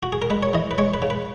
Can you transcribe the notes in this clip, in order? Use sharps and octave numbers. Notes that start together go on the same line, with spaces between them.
F#4
G#4
A#4
G#3 B4
C#5
E3 D#5
B4
G#3 C#5
B4
C#3
B4